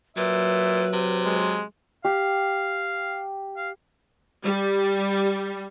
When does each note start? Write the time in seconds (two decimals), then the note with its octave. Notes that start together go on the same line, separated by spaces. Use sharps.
0.17 A#2 F#3 B4 E5
0.93 C3
1.25 G#3
2.05 G4 F5
3.57 F5
4.43 G3